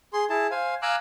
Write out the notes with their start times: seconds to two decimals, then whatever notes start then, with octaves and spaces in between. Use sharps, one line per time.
0.13 G#4 C6
0.30 E4 G#4 A5
0.51 C5 F5 G#5
0.82 F5 G#5 A#5 D6 E6 F#6